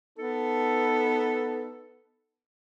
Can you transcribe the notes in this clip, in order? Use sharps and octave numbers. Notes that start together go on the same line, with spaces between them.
B3 D#4 A4